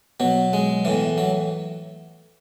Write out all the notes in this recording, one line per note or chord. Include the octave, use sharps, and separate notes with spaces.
B2 F#3
G#3
A2 E3
F#3